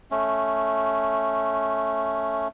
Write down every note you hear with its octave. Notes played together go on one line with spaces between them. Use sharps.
A3 C#4